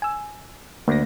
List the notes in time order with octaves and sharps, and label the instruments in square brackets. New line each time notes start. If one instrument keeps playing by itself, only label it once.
[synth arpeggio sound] G#5 E6
[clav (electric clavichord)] D2 [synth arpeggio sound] A#3 A#6